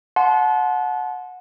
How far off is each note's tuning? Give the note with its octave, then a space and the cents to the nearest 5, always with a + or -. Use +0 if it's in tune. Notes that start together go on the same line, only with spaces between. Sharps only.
F#5 -20 A5 -30 C6 -5